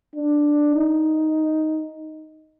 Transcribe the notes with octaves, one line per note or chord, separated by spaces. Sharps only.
D4
D#4